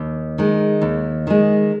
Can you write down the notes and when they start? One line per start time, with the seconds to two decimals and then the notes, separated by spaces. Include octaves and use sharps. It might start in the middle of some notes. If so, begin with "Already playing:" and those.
Already playing: D#2
0.38 D#3 G#3
0.82 D#2
1.27 D#3 G#3